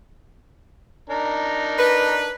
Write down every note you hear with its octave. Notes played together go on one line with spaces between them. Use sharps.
D4 D#4 A#4
B4